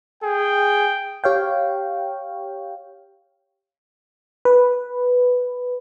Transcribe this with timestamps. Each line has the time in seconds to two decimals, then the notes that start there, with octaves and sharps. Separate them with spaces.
0.23 G#4 G5
1.24 G4 C#5 F5 G5
4.45 B4